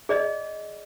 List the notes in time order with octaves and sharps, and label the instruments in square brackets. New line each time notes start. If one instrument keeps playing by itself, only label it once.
[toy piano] G#4 D5 D#5